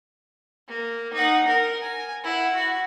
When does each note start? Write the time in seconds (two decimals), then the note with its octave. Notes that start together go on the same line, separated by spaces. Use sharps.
0.68 A#3
1.13 D#4 F#5
1.48 A#4
1.81 G#5
2.23 E4 F#5
2.55 F#4